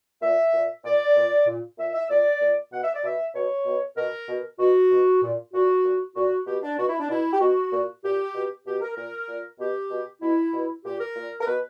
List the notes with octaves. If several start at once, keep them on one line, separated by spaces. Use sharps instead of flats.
A#2 E5
A#2
A#2 D5
A#2
A#2
A#2 E5
E5
A#2 D5
A#2
B2 F#5
E5
D5
B2 E5
B2 C#5
B2
B2 A#4
B2
B2 F#4
B2
A#2
A#2 F#4
A#2
A#2 F#4
B2 G4
D4
B2 F#4
E4
D4
B2 E4
G4
B2 F#4
A#2
A#2 G4
B2
B2 G4
A#4
A#2 A#4
A#2
B2 G4
B2
B2 E4
B2
A#2 G4
A#4
A#2
A#4
B2 B4